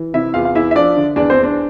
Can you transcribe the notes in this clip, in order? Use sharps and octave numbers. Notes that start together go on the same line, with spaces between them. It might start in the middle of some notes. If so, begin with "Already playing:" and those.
Already playing: E3
C3 E4 E5
E2 F4 F5
F5
E2 E4 E5
E5
F3 D4 D5
D3
E2 D4 D5
C4 C5
E2
D4